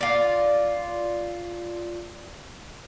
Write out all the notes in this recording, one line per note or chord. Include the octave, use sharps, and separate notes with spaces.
F4 D5